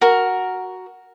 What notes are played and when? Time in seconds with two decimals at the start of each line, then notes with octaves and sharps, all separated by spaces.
0.01 F#4 A#4